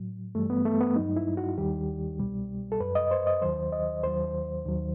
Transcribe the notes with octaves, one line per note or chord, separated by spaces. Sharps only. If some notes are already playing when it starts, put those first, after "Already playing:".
Already playing: A2 F#3
G2 E3 G3 A3
B3
A3
B3
G2 F#3 D#4
E4
F#4
D#2 D#3 G3 G4
C2 B2 G3
A4
F#2 F#3 B4
D#5
C5
D#5
D#2 D#3 F#3 C5
D#5
D#2 D#3 F#3 C5
D#2 D#3 F#3